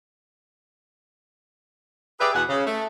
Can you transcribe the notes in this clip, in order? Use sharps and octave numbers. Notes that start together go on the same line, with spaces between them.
G4 G#4 B4 D5 E5
E2 B2 G#4 F#5
C#3
A3